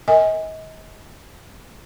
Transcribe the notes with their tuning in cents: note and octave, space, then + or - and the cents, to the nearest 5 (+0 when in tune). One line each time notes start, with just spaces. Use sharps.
A#4 -5 D#5 +35 G#5 -20